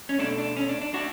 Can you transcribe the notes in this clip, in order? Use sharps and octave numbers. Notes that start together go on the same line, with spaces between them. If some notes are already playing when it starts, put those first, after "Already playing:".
C#4
B2 A3 D4
D4
C#4
D4
D4
D4 F#4